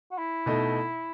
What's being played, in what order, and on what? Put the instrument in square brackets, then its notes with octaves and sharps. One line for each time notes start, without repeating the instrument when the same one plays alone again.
[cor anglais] F#4
E4
[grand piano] B2 A3 D#4